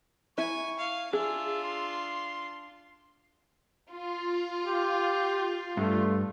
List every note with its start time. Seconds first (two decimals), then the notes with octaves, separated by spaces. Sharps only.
0.38 E4 G#5 C#6
0.79 F5
1.13 D4 F4 G#4 E5
1.64 C6
3.93 F4
4.64 G4
5.77 G2 A3